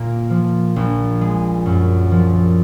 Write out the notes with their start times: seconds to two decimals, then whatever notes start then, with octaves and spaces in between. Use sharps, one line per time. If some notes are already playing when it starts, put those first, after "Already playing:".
Already playing: A#2 A#3
0.30 F3
0.76 A#1
1.21 G#3
1.66 F#2
2.12 F3